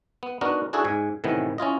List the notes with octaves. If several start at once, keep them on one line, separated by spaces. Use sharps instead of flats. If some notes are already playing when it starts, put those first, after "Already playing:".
B3
B3 D4 D#4 F#4 A#4
D4 E4 F#4 G#4 A4
G#2 G#5
A2 C3 D#3 E3 B3
C#4 E4 F4 D#5